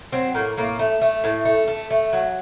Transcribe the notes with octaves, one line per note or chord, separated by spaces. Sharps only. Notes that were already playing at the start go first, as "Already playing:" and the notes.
F#3 C4
A2 A#3
A2 A#3
A3
A3
A2
A3
A3
A3
F#3